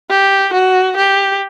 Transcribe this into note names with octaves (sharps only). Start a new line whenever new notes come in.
G4
F#4
G4